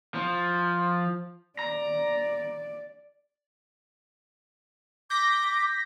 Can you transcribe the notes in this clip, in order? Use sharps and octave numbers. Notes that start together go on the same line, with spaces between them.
F3
D5 A#5
D6 G6 A#6 B6